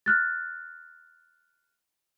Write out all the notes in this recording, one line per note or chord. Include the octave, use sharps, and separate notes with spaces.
F6 F#6 A6